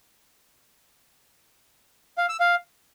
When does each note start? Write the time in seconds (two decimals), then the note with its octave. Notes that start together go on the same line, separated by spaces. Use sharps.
2.18 F5
2.29 E6
2.40 F5